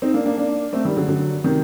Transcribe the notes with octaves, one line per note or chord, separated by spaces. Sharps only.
C4 D#4
A#3 D4
A#3 D4
A#3 D4
A3 C4
D#3 G3
D3 F#3
D3 F#3
C3 D#3